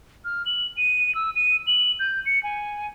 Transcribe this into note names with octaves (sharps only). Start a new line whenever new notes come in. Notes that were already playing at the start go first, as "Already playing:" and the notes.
F6
F#7
D#7
E6
D#7
F#7
G6
C#7
G#5